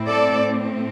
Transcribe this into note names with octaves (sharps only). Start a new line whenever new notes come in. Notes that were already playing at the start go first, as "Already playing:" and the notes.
Already playing: A2 A3 C4 E4
A4 D5